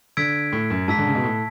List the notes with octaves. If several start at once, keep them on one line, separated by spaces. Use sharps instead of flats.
D3 E6 G#6 B6 D7
A2
F#2
G#2 A5 E6 B6
D3
C#3
B2
A2